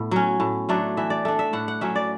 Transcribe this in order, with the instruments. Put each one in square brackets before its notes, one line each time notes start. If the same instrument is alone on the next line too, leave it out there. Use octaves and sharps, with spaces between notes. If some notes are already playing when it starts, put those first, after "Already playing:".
Already playing: [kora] A2 B3
F#3 C#4
A2
F#3 A3 D4
E3 E5
D5
A3 D4
E5
A2 F#5
F#5
F#3 C#4 E5
D5